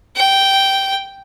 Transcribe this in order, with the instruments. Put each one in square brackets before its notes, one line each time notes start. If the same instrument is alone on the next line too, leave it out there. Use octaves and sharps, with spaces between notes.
[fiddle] G5